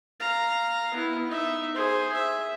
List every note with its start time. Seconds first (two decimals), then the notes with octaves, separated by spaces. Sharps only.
0.20 F5 A#5
0.94 B3 E4
1.27 D#4 E5
1.75 G#4 C5
2.13 E5